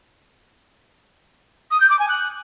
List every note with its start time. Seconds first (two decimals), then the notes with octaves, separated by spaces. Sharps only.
1.71 D#6
1.80 G6
1.89 D6
1.99 G#5
2.08 F#6